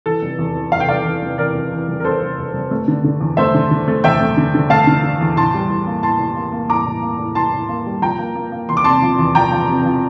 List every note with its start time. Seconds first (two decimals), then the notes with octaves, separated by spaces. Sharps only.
0.06 E3 A4
0.22 F1
0.39 E2
0.56 E3
0.72 F1 F5
0.80 G5
0.89 F1 D5 F5
1.05 E3
1.22 F1
1.38 E3 A#4 D5
1.55 F1
1.72 E3
1.89 F1
2.00 A#4
2.04 F1 A4 C5
2.22 F1
2.38 F1
2.54 F1
2.71 A3
2.88 D3
3.04 D3
3.21 E2
3.37 A3 C5 E5
3.54 D3
3.71 D3
3.88 A3
4.04 E2 E5 G5
4.20 A3
4.37 D3
4.54 D3
4.70 A3 F5 A5
4.87 D3
5.03 D3
5.21 E2
5.36 A2 A5 C6
5.54 G3
5.70 A2
5.87 A#3
6.03 A2 A5 C6
6.19 A2
6.36 A#3
6.52 A#3
6.70 A2 A#5 D6
6.86 A2
7.02 A#3
7.19 A2
7.35 A2 A5 C6
7.53 A2
7.69 A#3
7.86 G3
8.02 F3 G5 A#5
8.19 A#3
8.36 A#3
8.52 A#3
8.69 E2 C6
8.77 D6
8.84 C3 A5 C6
9.02 F3
9.19 E2
9.35 F3 G5 A#5
9.52 F3
9.68 C3
9.85 F3